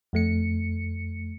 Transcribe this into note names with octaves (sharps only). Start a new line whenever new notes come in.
F2 A3 C#7